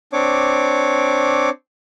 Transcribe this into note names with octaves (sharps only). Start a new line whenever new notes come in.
C4 D4 C#5 D6